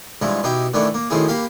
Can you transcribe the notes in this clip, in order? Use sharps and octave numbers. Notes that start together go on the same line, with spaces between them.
G2 F3 G#3 E4
B2 D#4 E4 G4
A2 D#3 E3 A3 D4 E4
A#3
F#2 A2 D#3 C4 E4 G#4
A#3 G4 F5 B5